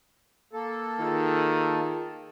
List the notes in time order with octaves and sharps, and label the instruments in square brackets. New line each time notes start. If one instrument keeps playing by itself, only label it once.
[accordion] A#3 A4
[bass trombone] D#3 [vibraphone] F4 G#4 A5